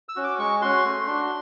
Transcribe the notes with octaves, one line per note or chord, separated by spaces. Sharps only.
E6
C#4 F#4
D6
G#3 C#6
C#4 F#4 C6
A3
D4 F#4